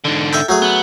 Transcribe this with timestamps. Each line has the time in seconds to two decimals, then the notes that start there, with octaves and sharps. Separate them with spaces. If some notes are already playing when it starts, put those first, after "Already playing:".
0.05 G#2 D3
0.33 A4 E5 G5
0.49 F#3 A3 G#4
0.62 B3